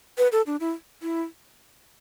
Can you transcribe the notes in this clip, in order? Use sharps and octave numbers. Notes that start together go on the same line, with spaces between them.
B4
A4
D4
E4
E4